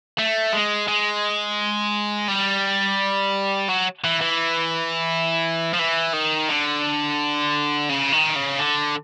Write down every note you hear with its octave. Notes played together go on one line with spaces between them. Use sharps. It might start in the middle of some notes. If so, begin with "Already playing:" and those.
A3
G#3
G#3
G3
F#3
E3
E3
F3
E3
D#3
D3
C#3
D#3
C#3
D3